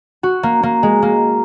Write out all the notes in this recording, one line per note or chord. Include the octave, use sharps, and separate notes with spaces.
F#4
A#3
A#3
G#3
A#3